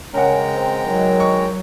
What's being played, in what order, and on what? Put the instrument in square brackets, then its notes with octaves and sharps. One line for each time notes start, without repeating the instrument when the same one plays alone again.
[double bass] C#3 [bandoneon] G#3 G5 A#5 [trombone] C#4 [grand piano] A#4 F#5
[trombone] C4
[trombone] D#3 [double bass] F#3
[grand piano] C#6